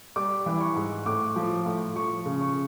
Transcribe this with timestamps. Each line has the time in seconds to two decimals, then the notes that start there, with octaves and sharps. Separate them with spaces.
0.16 G3 D6
0.46 E3
0.61 C#6
0.76 G#2
1.06 A2 D6
1.36 F3
1.66 A2
1.96 F3 C#6
2.26 C#3
2.41 C#6